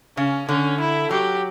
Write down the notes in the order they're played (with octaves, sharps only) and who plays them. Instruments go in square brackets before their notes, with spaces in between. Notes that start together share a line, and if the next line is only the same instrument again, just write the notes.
[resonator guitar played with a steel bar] C#3 [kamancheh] C#4
[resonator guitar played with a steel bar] D3 [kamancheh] C#4
[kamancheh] E4
[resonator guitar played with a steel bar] F#3 [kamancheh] G4